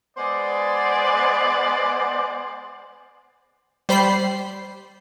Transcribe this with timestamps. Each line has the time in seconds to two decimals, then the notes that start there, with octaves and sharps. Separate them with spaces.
0.17 G#3 B3 C5 D5
3.89 G3 C5 B5 C7